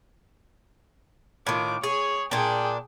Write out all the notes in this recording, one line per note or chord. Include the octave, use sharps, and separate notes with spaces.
A2 D#3 F4 D6
G#4 C#5
A#2 D4 G#4 G5